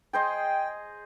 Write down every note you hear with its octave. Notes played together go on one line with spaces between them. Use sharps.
G#4 C5 D#5 G5